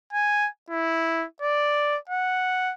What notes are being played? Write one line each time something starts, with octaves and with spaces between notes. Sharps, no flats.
G#5
E4
D5
F#5